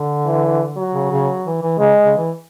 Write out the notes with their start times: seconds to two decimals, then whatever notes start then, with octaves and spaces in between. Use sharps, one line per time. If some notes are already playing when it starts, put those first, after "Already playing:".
Already playing: D3
0.26 E3
0.77 F#3
0.93 C#3
1.11 C#3
1.46 E3
1.62 E3
1.79 C#3 G#3
2.05 C#3
2.17 E3